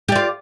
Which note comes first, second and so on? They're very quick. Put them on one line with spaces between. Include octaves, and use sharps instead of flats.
G4 D5 F4